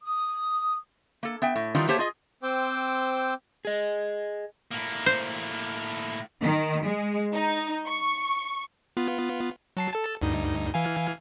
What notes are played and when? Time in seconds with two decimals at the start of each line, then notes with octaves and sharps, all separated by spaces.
0.02 D#6
1.23 A#3 A4
1.42 B3 E5 G5
1.56 A2
1.75 D#3 E3 G3 D#4 F4
1.87 A3 A#3 G4 C5 C#5 A5
1.99 F4 G#4 D#5
2.43 C4 C5 G5 D6 E6
3.65 G#4 D#5
4.71 A2 A#3
5.06 C5
6.42 D#3
6.85 G#3
7.33 D#4
7.87 C#6
8.97 B3 F4
9.77 F#3 A5 C7
9.93 A4 A5
10.22 D2 G2 D#4
10.74 E3 F5 G#5